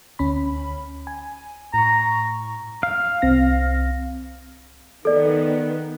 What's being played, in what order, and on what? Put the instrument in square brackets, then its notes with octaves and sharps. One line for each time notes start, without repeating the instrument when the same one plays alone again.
[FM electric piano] D2 C#4 B5
G#5
[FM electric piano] A2 C#6 [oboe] A#5
[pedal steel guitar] F5
[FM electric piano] C2 C4 A#6
[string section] D#3 B3 [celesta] A4 D5